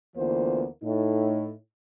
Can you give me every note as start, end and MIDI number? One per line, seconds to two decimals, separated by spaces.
0.16 0.65 38
0.16 0.65 52
0.16 0.65 58
0.16 0.65 59
0.16 0.65 65
0.16 0.65 72
0.83 1.50 45
0.83 1.50 63